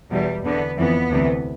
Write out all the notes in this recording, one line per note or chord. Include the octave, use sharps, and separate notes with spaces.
E2 B2 G3
E2 D3 B3
F2 E3 B3
D2 C3 E3